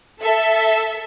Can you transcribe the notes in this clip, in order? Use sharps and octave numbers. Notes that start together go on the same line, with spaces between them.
A4 E5